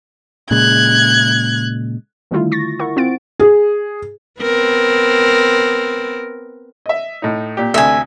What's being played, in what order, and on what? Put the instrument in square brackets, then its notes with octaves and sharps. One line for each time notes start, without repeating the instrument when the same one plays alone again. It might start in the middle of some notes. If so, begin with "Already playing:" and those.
[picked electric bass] A#2 C#3 G#3 [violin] F#6 G#6
[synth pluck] D3 D#3 G3 A3 E4 F4
C#6 A6 A#6
E4 A#4 F#5 C#6
C4 F4 F#5 A6 D7
[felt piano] G#4
[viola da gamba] B3 C4 A#4
[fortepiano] D#5 E5
A2 D#4
A#2 G4
[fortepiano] D2 C3 A3 [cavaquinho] E5 G#5